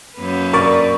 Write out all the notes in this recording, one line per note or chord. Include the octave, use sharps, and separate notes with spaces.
F#2 A#3 B4
A#4 D5 C#6